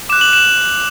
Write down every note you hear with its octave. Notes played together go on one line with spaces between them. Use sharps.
D6 F#6 E7
F#7
E7